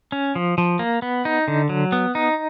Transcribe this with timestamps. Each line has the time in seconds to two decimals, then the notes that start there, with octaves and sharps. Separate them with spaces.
0.12 C#4
0.36 F3
0.58 F3
0.79 A#3
1.02 B3
1.25 D#4
1.48 D3
1.69 F#3
1.92 B3
2.15 D#4